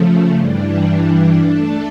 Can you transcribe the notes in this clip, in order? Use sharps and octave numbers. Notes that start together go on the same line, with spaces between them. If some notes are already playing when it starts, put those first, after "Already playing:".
Already playing: C#3 F3 A3
G2 E3 G3 D4
A3 D4 A4